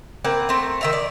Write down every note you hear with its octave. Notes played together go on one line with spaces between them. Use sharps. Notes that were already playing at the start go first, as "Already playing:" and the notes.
A#3 C4 B4 F#5
A3 C4
D#3 E5 A#5
D5